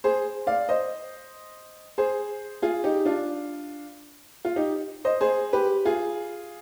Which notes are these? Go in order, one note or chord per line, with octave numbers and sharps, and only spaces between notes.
G#4 C5
D5 F5
C5 D#5
G#4 C5
F4 G#4
D#4 G4
D4 F4
F4
D#4 G4
C5 D#5
G#4 C5
G4 B4
F4 G#4